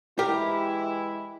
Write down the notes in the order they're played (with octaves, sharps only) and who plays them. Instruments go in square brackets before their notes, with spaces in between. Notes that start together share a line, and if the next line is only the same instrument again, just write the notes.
[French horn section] E3 G#3 E4 [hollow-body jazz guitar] G4 A#4